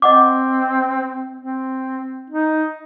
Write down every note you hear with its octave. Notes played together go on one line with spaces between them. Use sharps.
C4 D#5 F#5 D6
C4
D#4